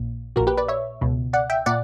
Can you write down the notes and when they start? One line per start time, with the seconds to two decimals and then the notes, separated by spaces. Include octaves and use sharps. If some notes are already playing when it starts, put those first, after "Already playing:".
Already playing: A#1 A#2
0.36 A#2 F#4 A#4
0.40 A#1
0.47 G4 B4
0.57 B4 D5
0.68 C#5 E5
1.01 C#2 B2
1.33 D5 F#5
1.50 E5 G5
1.66 A#2 D5 F#5